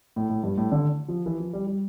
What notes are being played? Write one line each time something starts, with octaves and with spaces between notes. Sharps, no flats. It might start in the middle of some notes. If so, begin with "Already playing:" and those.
A2
A2
G2
A2
D3
F3
E3
F3
G3
G3